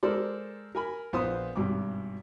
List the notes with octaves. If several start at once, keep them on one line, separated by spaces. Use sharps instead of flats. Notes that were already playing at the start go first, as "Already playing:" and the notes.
G#3 A4 A#4 C5 D5
A#4 G#5 B5
A#1 B3 F4 C5 C6 D#6
G#1 G2 B2 D6